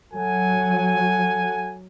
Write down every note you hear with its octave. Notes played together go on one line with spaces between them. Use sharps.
F#3 A4 F#5 G#5